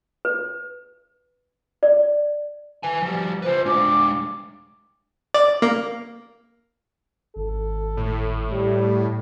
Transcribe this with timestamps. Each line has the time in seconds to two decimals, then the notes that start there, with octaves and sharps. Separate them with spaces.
0.25 B4
1.83 D5
2.83 B4 G#5
3.02 F3 G3
3.42 F4 B4 C5
3.66 G#3 D4 D6
5.34 D5
5.62 A#3
7.36 G#1 A4
7.97 A2
8.51 G3